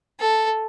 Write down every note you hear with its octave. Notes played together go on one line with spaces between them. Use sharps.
A4